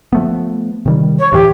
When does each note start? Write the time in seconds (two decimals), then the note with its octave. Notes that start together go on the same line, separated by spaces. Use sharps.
0.13 F3 A3 B3
0.86 C3 D#3 G3
1.19 C#5
1.32 D2 A2 E3 G4